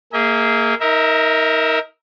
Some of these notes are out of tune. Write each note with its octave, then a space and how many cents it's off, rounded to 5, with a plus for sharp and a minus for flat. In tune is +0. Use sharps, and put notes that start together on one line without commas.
A#3 -15 G#4 +0 E5 -45
D#4 +30 A#4 +0 E5 +0